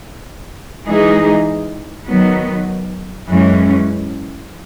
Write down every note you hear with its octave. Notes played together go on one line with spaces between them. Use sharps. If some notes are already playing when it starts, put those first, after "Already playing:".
E3 G#3 D#4 G#4
D#3 F#3 B3
F#2 E3 G#3 C#4